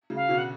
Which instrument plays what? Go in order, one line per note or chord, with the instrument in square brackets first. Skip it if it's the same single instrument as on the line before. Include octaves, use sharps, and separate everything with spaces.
[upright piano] C#3
[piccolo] F5
[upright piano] B2 D3
[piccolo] F#5